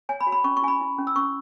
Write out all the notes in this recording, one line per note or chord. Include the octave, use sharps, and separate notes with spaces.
C#5 G#5
B5
F#4
B5
C#4 C#6
C#6
E4 G#5
B5
E4
C#4
E6
C#4 C#6